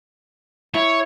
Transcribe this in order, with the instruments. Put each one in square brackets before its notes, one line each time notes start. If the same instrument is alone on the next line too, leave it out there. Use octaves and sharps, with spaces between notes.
[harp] E4 [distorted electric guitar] C#5